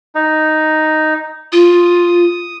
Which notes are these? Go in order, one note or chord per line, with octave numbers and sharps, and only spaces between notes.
D#4
F4 D#6